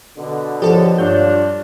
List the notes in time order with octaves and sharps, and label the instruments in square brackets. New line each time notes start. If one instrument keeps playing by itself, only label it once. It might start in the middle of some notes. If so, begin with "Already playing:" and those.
[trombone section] B2 D3
[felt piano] F3 C#5 [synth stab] G4 A4
[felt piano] G2 C#5 [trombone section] D4 F4 [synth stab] G6